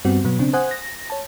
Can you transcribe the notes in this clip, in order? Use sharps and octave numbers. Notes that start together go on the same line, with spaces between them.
G2 G3 B3 C4 F#4
B2 F#3 B3
C#3 C4 D4
C5 F#5 G#5 D#6 F#6
A#6
C#5 A5